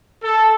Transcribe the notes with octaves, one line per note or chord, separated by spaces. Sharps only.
A4